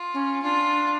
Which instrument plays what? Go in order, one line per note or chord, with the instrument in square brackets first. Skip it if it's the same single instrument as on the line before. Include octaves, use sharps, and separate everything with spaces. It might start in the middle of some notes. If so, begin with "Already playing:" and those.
Already playing: [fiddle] F4
[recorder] C#4
[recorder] D4 [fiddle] F4